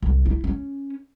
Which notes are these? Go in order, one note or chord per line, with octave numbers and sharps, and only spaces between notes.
C2
E4
C#4